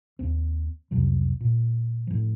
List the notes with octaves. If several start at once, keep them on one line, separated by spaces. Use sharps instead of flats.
D#2 C4
C2 F2 C3 F#3
A#2
A2 F3